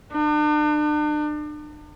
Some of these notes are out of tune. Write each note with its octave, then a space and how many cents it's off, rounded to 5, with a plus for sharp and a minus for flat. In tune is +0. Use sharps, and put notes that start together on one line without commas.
D4 +40